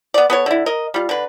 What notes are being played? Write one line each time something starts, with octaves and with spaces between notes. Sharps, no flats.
B3 D5
B3 A4 C#5
D3 E4
A#4 D#5
G3 F4
D3 B4